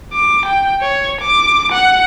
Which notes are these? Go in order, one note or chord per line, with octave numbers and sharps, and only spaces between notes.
D6
G5
C#5
D6
F#5